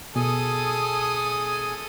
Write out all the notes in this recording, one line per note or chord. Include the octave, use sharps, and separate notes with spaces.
B2 G#4 A4 G#5 D#6